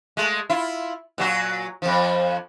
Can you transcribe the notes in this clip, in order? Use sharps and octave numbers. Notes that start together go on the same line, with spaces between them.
G#3 A3
E4 F4
A#2 F#3 F#4
F2 F3